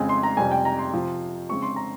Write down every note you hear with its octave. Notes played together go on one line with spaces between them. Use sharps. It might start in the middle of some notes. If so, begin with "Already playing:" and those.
Already playing: F2 C#3 G#3 C4 G#5
C6
A#5
F2 C3 G3 G#5
G5
A#5
C6
C3 F3 C4
C#3 G#3 C4 C#6
C6
A#5